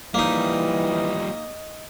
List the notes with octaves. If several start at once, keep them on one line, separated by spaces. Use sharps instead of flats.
E3 F3 G3 A#3 D#4 D#5